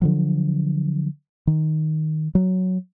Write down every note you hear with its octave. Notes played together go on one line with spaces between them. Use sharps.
D3 F3 F#3
D#3
F#3